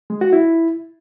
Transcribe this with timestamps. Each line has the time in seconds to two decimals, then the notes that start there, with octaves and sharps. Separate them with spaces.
0.10 G#3
0.21 F#4
0.33 E4